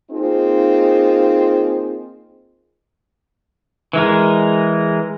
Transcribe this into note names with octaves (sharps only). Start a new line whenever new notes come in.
A#3 C4 D#4 F4 G#4
E3 G#3 A#4